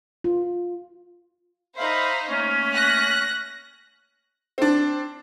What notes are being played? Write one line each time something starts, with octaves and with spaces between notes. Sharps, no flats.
F4
D#4 C5 E5 F5 B5
A3 A#3 C#4
F#6 A#6
C4 D4